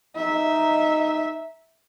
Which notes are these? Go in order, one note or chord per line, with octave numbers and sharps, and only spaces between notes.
D#4 E5